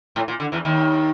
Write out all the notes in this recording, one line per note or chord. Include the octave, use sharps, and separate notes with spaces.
A2
A#2
D3
E2 E3
D#2 D#3